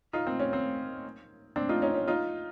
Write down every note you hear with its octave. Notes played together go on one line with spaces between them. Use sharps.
D#4 F4
C4
C#4
C4
C4 D4
D#4 F4
C#4 D#4
C#4
D#4 F4